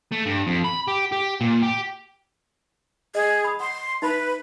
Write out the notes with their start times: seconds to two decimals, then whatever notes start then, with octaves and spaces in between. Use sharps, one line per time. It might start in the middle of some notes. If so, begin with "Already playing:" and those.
0.12 A3
0.26 G2
0.47 F2
0.64 B5
0.88 G4
1.12 G4
1.41 A#2
1.62 G4
3.15 G#4 D#5
3.44 B5 D#6
3.60 F#5 C6
4.02 D#4 B4 E5 B5